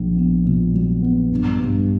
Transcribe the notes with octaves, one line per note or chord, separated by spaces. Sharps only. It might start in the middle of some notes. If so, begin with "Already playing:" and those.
Already playing: A#1 A#2
B3
A#2
F#3
B3
G2
G2